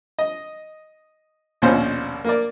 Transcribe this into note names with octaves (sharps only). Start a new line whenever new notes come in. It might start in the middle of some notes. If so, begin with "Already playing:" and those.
D#5
A#1 D#2 B2 C#4 C5
A#3 A#4 D5